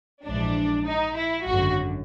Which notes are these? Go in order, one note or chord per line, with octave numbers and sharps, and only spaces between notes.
A#1 G#2 E3 D4
D#4
E4
G#1 F#2 D3 F#4